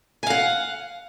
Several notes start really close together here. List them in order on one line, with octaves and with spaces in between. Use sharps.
G#5 F5 F#5